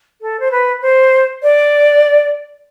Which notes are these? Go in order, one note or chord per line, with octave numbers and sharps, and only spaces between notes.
A4
C5
B4
C5
D5